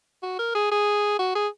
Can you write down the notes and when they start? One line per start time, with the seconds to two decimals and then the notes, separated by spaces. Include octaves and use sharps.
0.23 F#4
0.39 A#4
0.55 G#4
0.71 G#4
1.19 F#4
1.35 G#4